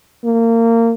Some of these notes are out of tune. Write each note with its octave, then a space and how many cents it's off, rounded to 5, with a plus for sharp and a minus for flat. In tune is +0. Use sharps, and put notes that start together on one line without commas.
A#3 -25